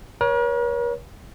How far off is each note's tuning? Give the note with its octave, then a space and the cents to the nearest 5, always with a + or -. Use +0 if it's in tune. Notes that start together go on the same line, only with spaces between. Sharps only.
A#4 +45 C#5 +10